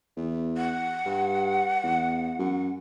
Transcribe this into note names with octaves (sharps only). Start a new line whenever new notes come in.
E2
F#5
G2
E2
F#2